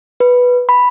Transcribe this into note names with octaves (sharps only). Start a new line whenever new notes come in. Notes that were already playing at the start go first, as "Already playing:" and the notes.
B4
B5